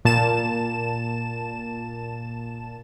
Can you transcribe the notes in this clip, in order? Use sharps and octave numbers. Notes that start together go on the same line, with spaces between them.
A#2 A5 E7